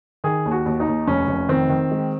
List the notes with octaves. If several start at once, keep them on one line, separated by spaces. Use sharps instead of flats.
D#3 G#4
D#2
F#4
D#2
D#4
D#2
F1 C#4
F1
D#3 C4
D#3
G#3